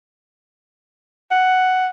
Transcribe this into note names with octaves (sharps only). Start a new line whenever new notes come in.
F#5